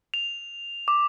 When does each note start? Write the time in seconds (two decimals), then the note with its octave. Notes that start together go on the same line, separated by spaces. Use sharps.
0.14 F7
0.88 D6